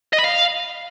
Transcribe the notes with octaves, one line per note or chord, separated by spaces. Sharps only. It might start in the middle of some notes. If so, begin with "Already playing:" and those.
D#5
B5
F5